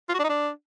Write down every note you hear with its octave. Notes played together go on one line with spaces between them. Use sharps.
F4
F#4
D4
D#4
D4